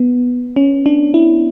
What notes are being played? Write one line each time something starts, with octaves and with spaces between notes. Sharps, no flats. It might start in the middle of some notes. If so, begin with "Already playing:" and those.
Already playing: B3
C#4
D4
E4